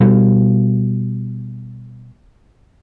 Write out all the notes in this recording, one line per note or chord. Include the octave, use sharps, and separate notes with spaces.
B2 G3